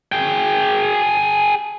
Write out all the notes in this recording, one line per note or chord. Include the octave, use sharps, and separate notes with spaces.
G#4 G5